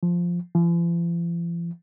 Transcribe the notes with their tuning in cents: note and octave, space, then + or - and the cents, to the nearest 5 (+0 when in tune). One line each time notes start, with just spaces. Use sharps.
F3 +0
F3 -45